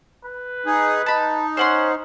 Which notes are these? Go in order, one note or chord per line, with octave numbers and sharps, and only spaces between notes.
B4
D#4 G#4
D#4 A5 B5
C#4 C5 F#5 C6